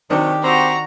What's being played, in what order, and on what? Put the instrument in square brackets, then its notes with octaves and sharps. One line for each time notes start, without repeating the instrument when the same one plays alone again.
[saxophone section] C3 F#3 [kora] D#3 D4 [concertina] G4
[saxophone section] C4 [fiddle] F#4 A#5